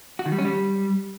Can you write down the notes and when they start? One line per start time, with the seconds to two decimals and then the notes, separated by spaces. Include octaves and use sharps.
0.19 F#4
0.26 D#3
0.32 G3
0.39 C#4
0.45 G3